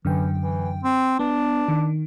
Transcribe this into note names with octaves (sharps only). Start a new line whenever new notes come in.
F#2 D3 E3 G5
E3
C4
B3 D4
D#3